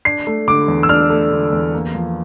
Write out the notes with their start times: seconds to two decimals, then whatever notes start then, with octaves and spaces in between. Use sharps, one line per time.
0.05 D4 C7
0.27 A3
0.48 D3 D6
0.68 E2
0.83 E6
0.89 D4 F6
1.10 A3
1.31 D3
1.52 E2
1.74 A#3
1.94 F3